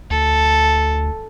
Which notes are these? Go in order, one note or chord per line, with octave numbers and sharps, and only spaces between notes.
D2 A4